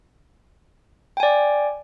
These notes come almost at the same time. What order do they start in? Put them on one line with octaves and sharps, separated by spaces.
G5 G#5 D5